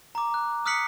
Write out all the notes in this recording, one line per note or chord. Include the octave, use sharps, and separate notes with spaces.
A#5 D6
F#6
D#6 F6 F#6 B6 C#7 F#7